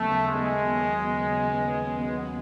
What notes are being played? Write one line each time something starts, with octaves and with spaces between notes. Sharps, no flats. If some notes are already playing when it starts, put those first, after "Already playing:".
Already playing: D#2 C#3 F#3 A3 B3
G#3